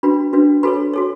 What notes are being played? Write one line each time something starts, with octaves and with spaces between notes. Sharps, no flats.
D4 F#4 B4 B5
D4 F#4 B4
F#4 A4 B4 C#5 B5
F#4 A4 C#5